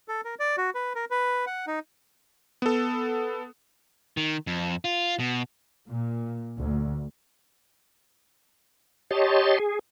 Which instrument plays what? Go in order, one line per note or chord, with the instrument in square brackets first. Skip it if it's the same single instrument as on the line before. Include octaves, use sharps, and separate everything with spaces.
[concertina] A4
A#4
D5
F#4
B4
A#4
B4
F#5
D#4
[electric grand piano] B3 A4
[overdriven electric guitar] D#3
F2
F4
B2
[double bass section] A#2
D2
[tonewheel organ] G4 C#5 D#5 A5 C6
G#4